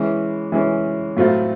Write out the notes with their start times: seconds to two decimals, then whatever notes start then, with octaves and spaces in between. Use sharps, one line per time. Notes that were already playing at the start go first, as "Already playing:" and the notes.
Already playing: E3 G#3 C#4
0.52 E3 G#3 C#4
1.17 A2 F#3 A3 C4 F4